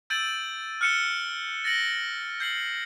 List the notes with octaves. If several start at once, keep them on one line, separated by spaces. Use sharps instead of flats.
E6 G6 A6 D7 D#7 F#7
F6 F#6 C#7 D#7 E7 G7
A6 A#6 C#7 D7 F#7 G7
G6 C7 F#7